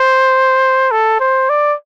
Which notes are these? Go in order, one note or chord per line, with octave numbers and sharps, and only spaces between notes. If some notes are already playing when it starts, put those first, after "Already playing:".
Already playing: C5
A4
C5
D5